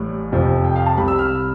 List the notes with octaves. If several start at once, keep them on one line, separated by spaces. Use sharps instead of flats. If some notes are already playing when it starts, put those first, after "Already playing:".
Already playing: A1 A2 G3
F1 F2 C3 F3
G5
F5
A5
C2 C3 G3 B5
E6
F6